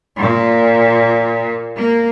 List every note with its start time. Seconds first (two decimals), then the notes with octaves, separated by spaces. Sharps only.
0.19 A#2
1.77 A#3